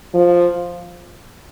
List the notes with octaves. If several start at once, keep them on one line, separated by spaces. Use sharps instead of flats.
F3